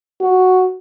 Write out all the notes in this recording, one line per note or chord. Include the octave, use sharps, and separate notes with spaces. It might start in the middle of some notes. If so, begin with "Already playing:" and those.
F#4